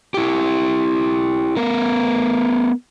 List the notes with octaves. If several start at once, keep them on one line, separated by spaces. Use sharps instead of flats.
E4 G4
A3 B3 A#4